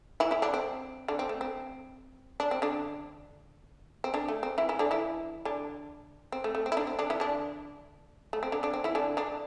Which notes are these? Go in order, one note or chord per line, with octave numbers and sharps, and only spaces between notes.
E3 E4
E3 E4
D3 D4
C4
D3 D4
C4
A3
C4
D4
C4
D3 D4
C4
D3 D4
A3
C4
E3 E4
E3 E4
D3 D4
E3 E4
D3 D4
C4
A3
A3
C4
E4
D3 D4
C4
D3 D4
E3 E4
D3 D4
A3
C4
D3 D4
D3 D4
C4
E3 E4
D3 D4
D3 D4